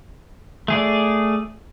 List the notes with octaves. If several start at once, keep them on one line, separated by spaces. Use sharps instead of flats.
A3 G#4 D5